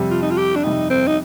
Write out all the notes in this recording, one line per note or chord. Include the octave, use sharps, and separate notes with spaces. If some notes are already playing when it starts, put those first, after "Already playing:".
Already playing: F2 C3 G3
F4
D#4
F4
G4
D4
F2 C3 G3 D#4
C4
D#4